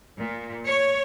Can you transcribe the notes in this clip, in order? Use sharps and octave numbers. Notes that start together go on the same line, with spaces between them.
A#2
C#5